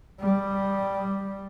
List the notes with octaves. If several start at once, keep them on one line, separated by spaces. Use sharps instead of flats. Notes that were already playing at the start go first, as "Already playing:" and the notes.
G3